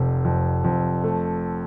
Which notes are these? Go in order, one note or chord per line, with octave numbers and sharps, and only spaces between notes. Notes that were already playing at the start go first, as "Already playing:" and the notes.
Already playing: F1 F2
F2
F2
A3